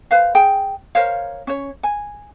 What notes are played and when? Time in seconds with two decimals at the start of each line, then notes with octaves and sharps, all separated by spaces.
0.11 B4 C5 F5
0.35 G#4 G5 G#5
0.95 A#4 C5 C#5 F5
1.47 C#4 C#5
1.83 G#5